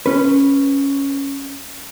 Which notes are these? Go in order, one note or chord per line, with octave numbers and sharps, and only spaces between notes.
C#4 B4